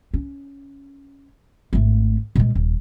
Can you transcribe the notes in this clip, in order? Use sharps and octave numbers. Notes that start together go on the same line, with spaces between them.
C#4
G#1 A3
A#2 G#3
D#1